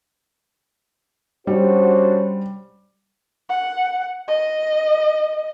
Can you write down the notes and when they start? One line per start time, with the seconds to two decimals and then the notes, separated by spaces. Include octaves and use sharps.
1.47 G3 C#4 D4 F#4 C5
3.49 F#5
4.28 D#5